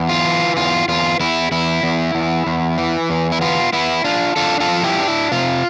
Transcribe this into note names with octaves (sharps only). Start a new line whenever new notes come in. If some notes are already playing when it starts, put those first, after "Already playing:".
Already playing: E2
F4
E3
E2 F4
E2 F4
E2 E4
E2 E4
E2
E2
E2
E3
E2
E4
B3 F4
B3 E4
D4 F4
D4 F4 A4
F4 A4
F3
E4 G4
D4
E4
C3 F4